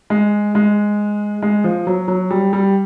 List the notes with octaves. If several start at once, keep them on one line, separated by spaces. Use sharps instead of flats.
G#3
G#3
G#3
F3
F#3
F#3
G3
G3